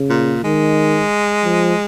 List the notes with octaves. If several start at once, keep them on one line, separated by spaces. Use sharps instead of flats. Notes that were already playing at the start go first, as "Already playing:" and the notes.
Already playing: C#3
A#2
D#3 G#3
F3